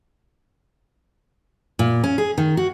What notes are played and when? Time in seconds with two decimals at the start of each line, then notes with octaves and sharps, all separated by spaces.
1.79 A#2
2.04 C#4
2.18 G#4
2.38 D#3
2.57 F#4